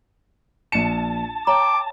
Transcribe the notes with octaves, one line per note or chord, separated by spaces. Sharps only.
A#1 A5 C#7
C#5 G5 A#5 D6